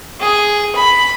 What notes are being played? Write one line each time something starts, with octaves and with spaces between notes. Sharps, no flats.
G#4
B5